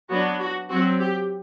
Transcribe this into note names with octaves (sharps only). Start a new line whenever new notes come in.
F#3 B3 D4 F#4
F#4
F#3 C4 F#4
G4